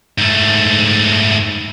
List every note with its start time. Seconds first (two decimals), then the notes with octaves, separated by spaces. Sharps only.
0.18 G#2 A3